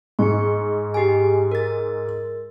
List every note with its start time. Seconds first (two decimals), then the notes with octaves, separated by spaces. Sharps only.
0.19 G#2 C#6 C#7
0.94 G4 G#4 G#5
1.52 A#4 A6